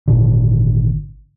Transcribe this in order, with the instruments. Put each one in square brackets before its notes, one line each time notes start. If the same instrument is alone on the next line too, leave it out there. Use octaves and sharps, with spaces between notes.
[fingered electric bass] G#1 A#2 D3